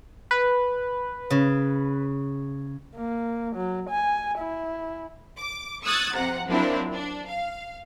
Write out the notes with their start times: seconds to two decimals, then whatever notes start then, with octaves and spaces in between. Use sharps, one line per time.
0.31 B4
1.30 C#3
2.96 A#3
3.56 F#3
3.89 G#5
4.38 E4
5.38 D6
5.83 C#6 D#6 E6 F#6 G#6 A6
6.13 F2 C3 F#5 A#5
6.47 F3 F#3 A#3 C4 D4 E4
6.94 D4
7.27 F5